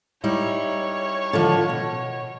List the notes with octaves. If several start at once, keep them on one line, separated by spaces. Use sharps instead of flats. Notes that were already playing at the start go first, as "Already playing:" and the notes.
G3 D#4 E4 C#5
D3 D#3 F3
B2